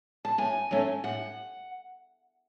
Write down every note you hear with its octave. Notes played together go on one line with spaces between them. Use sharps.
A5
A2 G#5
F#3 A3 C#4
A2 F#5